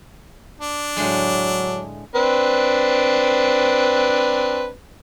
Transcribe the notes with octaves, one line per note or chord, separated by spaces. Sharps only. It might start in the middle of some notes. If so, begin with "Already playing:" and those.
D4
A2 D3 F#3 G#3
C4 D4 B4